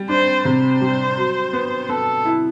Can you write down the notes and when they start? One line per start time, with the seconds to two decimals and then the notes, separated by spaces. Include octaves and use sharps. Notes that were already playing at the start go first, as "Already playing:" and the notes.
Already playing: G3
0.09 D4 C5
0.45 C3 C5
0.82 G3
1.17 F#3
1.53 B3
1.89 B3 A4
2.25 E4